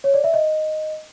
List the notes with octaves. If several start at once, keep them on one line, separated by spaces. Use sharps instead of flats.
C#5
D5
E5
D#5